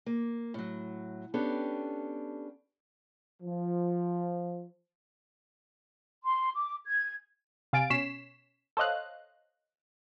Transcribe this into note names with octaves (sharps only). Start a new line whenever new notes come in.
A#3
A2 F#3
B3 C#4 D4 G4 A4
F3
C6
D6
G#6
C3 F5 G#5 A6 D7
B2 C#4 C#5 B6 C7 E7
A4 C5 C#5 D#5 F5 F#6